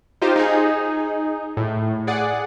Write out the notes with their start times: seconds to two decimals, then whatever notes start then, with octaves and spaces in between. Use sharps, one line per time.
0.22 D#4 F4 G4 C5
0.36 D#4 G#4
1.57 A2
2.07 G#4 D5 F#5